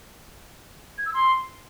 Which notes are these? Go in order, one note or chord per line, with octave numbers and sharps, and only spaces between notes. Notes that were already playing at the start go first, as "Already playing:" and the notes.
G#6
E6
C6